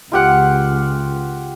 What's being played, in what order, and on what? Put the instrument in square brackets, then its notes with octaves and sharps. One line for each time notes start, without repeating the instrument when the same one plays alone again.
[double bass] C#2 [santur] F4 G4 F#5